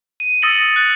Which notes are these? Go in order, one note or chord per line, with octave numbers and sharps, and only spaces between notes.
D#7
D#6 E6 A6 A#6 C#7 F#7
F#6 A6 C#7